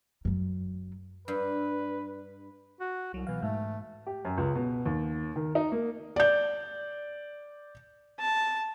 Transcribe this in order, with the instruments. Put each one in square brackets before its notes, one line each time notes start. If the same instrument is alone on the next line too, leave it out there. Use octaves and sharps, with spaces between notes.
[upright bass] F#2 F#3
[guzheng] G2 [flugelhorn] B4
[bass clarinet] F#4
[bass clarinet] C2 [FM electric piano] F#3
[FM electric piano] B2 F5 [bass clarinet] E3
[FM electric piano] G#2 [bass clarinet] A3
[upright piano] G4
F#2
C#2
B2
D#2
D#3
D#4
A#3
[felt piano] D5 G6
[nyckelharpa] A5